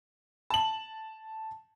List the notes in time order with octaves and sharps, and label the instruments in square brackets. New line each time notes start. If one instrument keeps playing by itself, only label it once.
[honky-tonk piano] A5 F#7